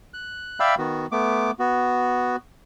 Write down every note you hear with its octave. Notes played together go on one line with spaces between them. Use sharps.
F#6
D5 E5 F5 G5 B5 E6
D#3 B3 F#4
A3 B3 D6
B3 F#4